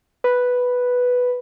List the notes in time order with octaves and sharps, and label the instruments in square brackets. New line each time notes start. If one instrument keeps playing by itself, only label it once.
[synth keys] B4